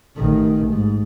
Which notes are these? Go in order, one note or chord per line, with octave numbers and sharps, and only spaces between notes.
A1 D#3
G#2